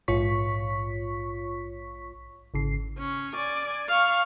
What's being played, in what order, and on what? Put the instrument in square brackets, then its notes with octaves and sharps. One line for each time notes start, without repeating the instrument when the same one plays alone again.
[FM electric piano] A#1 G#2 F4 C#5 C#6 B6
G#1 C#3 C7
[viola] C#4
D5 G#5
F5 C#6